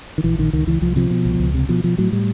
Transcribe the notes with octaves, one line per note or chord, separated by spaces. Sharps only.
D#3
A#1 E3
A#1 D#3
C#2 D#3
C#2 E3
C2 F3
C3 F3
B2
C2
C#2
C3
B2 F3
B2 F3
A2 F#3
A2 G3